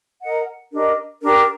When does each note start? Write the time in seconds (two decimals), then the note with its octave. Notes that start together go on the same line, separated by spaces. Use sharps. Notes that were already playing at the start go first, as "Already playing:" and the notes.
0.22 A#4 D#5 F#5
0.73 D4 G4 A#4 D#5
1.23 D4 G4 A#4